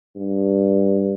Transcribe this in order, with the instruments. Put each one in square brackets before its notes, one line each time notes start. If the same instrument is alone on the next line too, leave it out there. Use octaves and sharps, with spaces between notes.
[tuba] G2